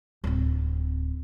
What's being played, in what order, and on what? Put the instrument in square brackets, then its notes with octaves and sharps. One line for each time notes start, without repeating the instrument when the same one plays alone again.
[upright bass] D1 C4